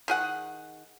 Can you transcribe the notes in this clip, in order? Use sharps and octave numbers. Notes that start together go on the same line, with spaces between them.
D#3 G#4 F#5